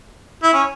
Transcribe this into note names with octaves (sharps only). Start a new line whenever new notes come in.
E4
C#4